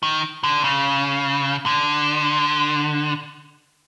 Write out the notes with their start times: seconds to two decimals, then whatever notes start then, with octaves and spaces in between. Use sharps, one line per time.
0.03 D#3
0.43 D3
0.64 C#3
1.66 D3